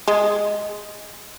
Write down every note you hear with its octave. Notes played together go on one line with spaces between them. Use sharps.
G#3